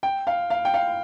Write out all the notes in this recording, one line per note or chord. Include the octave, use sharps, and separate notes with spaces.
G5
F5
F5
G5
F5